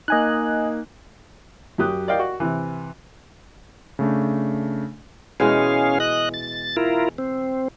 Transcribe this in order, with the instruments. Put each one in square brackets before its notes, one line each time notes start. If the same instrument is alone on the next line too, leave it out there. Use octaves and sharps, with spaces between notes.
[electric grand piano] A#3 D#4 [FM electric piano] D#5 G#5 F#6
[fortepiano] F#2 F#3 G4 D#6 F#6
A#4 D5 D#5 F5 G5
F#4
C3 E3
[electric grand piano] C#3 A3 D4
[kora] B2 E3 G#3 [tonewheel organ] C#4 G#4 F5
[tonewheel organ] D#5 F#6
A6
E4 F4 A#4
C4